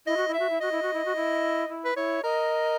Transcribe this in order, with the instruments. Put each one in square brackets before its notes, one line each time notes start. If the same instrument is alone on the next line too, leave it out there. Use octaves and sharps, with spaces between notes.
[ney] E4 [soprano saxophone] D#5
[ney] F#4
E4
[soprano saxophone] E5
[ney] F#4
E4
[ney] F#4 [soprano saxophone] D#5
[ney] E4
F#4
E4
F#4
E4
E4
[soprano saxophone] B4
[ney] E4 [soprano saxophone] C#5
[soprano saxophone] A#4 [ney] D#5